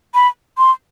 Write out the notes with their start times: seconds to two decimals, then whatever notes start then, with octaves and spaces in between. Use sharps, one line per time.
0.14 B5
0.58 C6